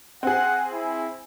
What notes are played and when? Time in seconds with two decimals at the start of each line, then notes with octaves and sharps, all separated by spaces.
0.23 C4 G#4 F#5
0.72 E4